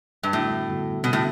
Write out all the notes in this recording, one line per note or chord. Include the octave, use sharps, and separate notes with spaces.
G2
F#2 A2 D3 G3 B3 F#4
F#2 D3 G3 B3 F#4
B2 D3 G3 B3 F#4
A2